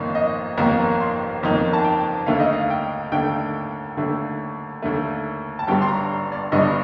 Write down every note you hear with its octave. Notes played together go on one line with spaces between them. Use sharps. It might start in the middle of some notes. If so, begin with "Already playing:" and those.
Already playing: G1 F2 D#3 A#3 D#4 D5
D#5
G1 F2 D#3 A#3 D#4 A#5
C6
G1 F2 D#3 A#3 D#4
A5
G5
D#2 D3 A3 F5
D#5
F5
G5
D#2 D3 A3 G5
D#2 D3 A3
D#2 D3 A3
A5
G1 G2 D3 G3 G5
C6
A#5
D5
G1 G2 D3 G3 D#5